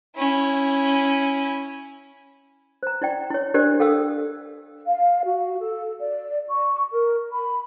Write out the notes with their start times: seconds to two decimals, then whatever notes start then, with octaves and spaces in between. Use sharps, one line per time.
0.16 C#4 E4
2.83 C5 A#5
3.02 E4 D5 G5
3.30 E4 C#5
3.54 D4 E4 G4 A#4 C5 D5
3.80 A4 F5 G5 D#6 E6
4.86 F5
5.24 F#4
5.59 A4
6.00 D5
6.48 C#6
6.92 A#4
7.32 B5